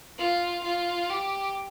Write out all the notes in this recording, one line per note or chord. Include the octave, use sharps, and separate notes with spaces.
F4
F4
G4